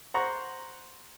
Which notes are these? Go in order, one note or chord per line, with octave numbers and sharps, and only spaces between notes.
C5 F#5 A#5 C#6